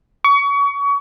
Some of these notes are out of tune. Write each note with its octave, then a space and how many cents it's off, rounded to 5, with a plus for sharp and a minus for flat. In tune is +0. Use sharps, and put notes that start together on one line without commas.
C#6 +30